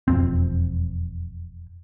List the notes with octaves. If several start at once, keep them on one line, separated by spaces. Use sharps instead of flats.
E1 F2 C4